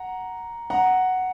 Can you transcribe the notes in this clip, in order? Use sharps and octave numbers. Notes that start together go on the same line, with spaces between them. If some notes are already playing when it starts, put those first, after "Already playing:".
Already playing: F#5 A#5
F#5 A#5